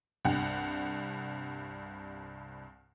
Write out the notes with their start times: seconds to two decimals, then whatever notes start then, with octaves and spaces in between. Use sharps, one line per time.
0.25 C2 G2 F#5